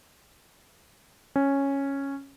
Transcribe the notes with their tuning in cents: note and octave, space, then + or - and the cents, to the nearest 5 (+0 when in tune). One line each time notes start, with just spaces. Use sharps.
C#4 -5